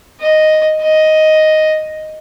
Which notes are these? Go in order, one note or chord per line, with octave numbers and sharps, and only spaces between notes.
D#5
D#5